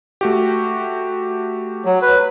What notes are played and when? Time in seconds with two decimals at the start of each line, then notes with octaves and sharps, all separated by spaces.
0.21 A3 F#4 G4
1.85 F#3
2.02 B4